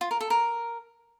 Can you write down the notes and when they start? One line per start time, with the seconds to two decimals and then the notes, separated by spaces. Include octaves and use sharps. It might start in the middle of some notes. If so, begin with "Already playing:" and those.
0.01 F4
0.11 A#4
0.21 A4
0.30 A#4